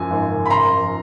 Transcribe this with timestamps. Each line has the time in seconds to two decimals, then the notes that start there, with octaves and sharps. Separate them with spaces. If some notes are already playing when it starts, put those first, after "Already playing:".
Already playing: F#2 F3 G#5
0.11 G#1
0.29 F#2
0.46 B5
0.50 F#2 A#5 C6
0.71 F3